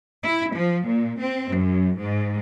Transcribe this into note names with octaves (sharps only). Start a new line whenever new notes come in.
E4
F3
A#2
C4
F#2
G#2